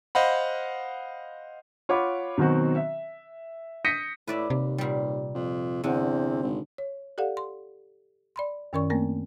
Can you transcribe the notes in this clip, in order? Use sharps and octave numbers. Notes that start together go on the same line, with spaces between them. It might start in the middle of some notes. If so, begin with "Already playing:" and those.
C5 D#5 F5 F#5 B5
F4 C#5 F#5 B5 D6
B2 D#3 F#3 C4 F#4
E5
D#6 G6 A#6 B6 C#7 D#7
A2 B4 D5 E5
D#2 C3
A#2 G3
F2
E2 D3 C4
G#1
C#5
G4 A4 D5 F5 F#5
C6
D5 B5 C6
F#2 D#3 C#4 A#4 D5 C#6
A3 A#3 C4 A#4